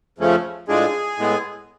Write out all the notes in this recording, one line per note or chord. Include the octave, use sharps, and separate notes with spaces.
F2 C#3 F3 A3 C#4
A2 F3 G#3 D4 G#4
A2 G#3 B3